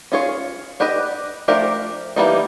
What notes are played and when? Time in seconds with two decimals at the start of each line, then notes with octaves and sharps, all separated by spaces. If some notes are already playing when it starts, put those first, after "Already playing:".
0.12 C#4 F4 G#4 C#5
0.80 D4 G4 B4 D#5
1.48 F3 A3 D4 G4 A#4
2.16 E3 G3 A#3 D#4